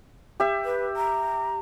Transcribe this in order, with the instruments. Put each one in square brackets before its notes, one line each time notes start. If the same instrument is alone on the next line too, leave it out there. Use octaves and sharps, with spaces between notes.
[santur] G4 E5
[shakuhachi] B4
A#5